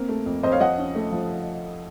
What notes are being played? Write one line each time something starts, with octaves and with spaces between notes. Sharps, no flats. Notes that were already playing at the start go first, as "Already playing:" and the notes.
Already playing: A#3 C4 A#4
A3
F2
F2 C5 D#5
C#5 F5
F3 D#5 F#5
C#4
A3
F3